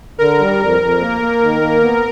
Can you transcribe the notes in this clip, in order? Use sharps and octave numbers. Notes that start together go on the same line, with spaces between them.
D3 A#4
G3
F2
F2
A#3
A#3
D#3
A#3
B3